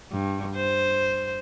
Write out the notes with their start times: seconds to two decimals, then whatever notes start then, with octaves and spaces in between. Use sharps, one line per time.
0.12 G2
0.56 C5